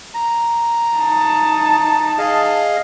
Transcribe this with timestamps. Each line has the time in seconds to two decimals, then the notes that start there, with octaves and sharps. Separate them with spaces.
0.14 A#5
0.97 D#4 A5
2.18 G#4 D#5 F5